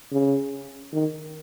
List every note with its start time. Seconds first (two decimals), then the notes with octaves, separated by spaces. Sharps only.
0.12 C#3
0.93 D#3